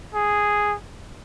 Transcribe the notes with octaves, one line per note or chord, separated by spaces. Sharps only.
G#4